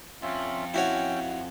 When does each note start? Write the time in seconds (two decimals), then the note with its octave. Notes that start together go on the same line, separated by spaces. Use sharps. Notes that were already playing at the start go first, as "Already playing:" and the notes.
0.22 F2 C#4 F4 E5
0.74 C#4 E4 F#4 C#5 G5